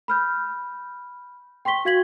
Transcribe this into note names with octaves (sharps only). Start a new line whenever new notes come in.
B5 F6 G6
G5 C6 C#6 B6 G7
F#4 F5 G#6 B6 F#7